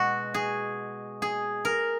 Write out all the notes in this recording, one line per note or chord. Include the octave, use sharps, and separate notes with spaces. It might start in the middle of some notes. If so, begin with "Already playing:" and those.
Already playing: B2 G#3 F#4
G#4
G#4
A#4